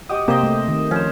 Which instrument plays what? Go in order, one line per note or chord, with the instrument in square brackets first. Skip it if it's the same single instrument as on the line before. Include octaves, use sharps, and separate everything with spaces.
[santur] F#4 G4 D#5 [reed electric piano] D#6
[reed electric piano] C3 A#3 G4 [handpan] C4 [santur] C5 D#5 G5
[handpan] A3
D#3
[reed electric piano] F3 [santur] C#4 C5